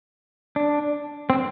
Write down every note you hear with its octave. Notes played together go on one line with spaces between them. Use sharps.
D4
C4